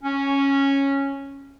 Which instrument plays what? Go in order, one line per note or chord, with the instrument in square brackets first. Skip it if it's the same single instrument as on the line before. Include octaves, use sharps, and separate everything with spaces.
[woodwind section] C#4